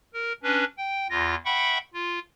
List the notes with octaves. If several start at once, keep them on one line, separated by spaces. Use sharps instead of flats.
A#4
C#4 D4 B4
G5
E2 F4 A#6
E5 F#5 G5 B5 C#6
F4